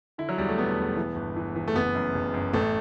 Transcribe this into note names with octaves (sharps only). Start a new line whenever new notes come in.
D3 E4
F#3
E2 G3
A3
E1 B3
E1
E3
G1
E3
E3
A3
F#1 B3
F#2
F#1
F#2
A1 A3